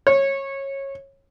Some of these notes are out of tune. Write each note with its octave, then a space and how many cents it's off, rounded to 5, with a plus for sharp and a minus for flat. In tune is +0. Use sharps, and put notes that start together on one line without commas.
C#5 -20